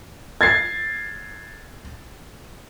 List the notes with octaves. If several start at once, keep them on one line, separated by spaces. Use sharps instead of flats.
G#6 A6 C7